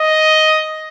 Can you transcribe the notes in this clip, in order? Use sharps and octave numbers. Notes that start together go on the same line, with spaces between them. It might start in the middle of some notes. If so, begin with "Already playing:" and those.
Already playing: D#5